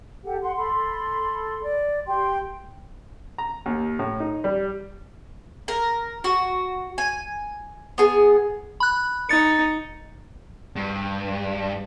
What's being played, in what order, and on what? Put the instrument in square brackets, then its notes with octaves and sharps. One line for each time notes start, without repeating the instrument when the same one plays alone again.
[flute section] G4 A4 F#5
F#5 C6
A4 B5 C6
D5
G4 G5 C6
[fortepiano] A#5
D#2
A2
D#4
G3
[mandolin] A#4
F#4
G#5
B3 G#4
[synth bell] B5 F#6
[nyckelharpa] D#4 [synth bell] A6 C#7
[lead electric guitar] G2